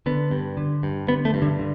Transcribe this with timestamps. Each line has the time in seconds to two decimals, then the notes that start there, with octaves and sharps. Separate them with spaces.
0.06 D3 B3
0.31 G2
0.57 D3
0.83 G2
1.08 D3 B3
1.25 A3
1.34 G2
1.42 D3
1.59 D3